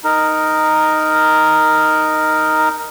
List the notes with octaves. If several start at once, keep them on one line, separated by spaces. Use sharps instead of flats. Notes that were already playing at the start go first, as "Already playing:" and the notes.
D#4 A#4